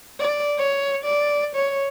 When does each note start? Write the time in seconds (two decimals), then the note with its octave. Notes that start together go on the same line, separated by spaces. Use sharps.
0.19 D5
0.58 C#5
1.05 D5
1.56 C#5